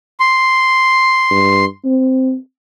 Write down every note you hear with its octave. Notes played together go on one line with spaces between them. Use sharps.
C6
G2
C4